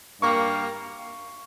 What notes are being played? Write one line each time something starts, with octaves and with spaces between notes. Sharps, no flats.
G2 G3 A#3 C#6